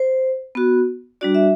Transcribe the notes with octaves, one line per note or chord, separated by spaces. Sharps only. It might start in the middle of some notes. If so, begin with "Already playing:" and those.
Already playing: C5
B3 F#4
G3 D4 F#4 D5
E5